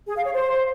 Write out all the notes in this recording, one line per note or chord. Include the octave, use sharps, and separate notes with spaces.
G#4
F5
C#5
C5